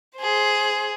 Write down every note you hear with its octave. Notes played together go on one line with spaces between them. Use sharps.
G#4 C5